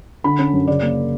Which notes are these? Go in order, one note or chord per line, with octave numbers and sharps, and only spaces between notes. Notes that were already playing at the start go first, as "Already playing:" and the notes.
D3 B5
C#4
F#2
C#3 D5
A#3